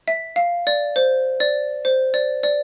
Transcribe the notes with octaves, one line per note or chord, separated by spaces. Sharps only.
E5
F5
D5
C5
D5
C5
D5
D5